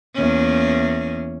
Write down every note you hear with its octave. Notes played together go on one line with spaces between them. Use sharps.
E2 A#3 C#4